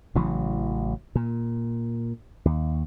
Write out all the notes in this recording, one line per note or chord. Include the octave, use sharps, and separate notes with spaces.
A1 C#3 E3 F#3
A#2
D#2